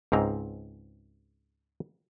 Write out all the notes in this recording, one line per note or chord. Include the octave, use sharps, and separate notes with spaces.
C#2 G#2 C4 A#5